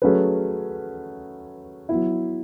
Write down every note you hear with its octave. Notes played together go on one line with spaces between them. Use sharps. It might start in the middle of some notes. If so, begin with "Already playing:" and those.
F#3 A3 C#4 G#4 B4
F#3 B3 E4